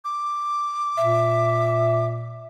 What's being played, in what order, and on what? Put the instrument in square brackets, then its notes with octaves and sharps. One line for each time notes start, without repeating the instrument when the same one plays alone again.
[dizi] D6
[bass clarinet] A#2 [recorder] E5